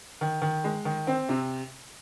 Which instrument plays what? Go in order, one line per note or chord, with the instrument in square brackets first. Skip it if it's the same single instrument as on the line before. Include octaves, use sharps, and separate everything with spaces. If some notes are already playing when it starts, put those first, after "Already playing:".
[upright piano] D#3
D#3
G#3
D#3
C4
C3